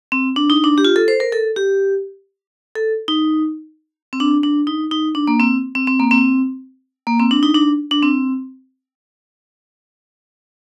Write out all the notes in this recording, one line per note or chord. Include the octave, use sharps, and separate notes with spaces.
C4
D4
D#4
D4
G4
F4
A4
C5
A#4
A4
G4
A4
D#4
C4
D4
D4
D#4
D#4
D4
A#3
C4
C4
C4
A#3
C4
A#3
C4
D4
D#4
D4
D4
C4